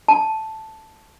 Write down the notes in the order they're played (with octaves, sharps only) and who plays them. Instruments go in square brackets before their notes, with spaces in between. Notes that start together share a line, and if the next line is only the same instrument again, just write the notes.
[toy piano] A5